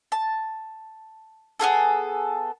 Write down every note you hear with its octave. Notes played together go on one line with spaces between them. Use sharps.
A5
B3 F4 G#4 A4